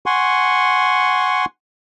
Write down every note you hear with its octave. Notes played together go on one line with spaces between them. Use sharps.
F#5 G#5 C6 C#6